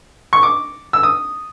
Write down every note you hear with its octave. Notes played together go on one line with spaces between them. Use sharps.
C#6
D6
E6
D#6